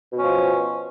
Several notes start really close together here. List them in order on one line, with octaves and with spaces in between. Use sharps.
B2 C#4 F3